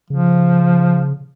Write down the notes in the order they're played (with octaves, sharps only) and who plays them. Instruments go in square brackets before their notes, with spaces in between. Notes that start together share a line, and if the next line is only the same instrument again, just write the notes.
[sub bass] C#3 [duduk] F3